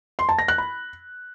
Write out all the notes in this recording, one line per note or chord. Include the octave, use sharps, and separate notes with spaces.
C6
A5
A#6
F#6
B5